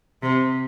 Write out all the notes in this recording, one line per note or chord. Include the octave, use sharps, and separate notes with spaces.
C3